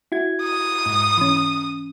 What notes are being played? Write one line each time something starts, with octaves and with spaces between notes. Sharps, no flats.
E4 F#4 G#6
D#6
G#2
E3 C#4